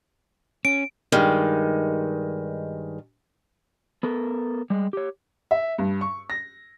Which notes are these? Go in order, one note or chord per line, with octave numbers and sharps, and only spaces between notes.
C#4 D7
G2 D#3 G#3
B3 A4 A#4
G3 G#3
G4 C#5
E5
G2
C#6
A#6